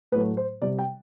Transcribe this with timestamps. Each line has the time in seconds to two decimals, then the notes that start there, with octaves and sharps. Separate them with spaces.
0.12 A2 F#3 A3 B4
0.37 C5
0.62 C3 G3 D5
0.79 G5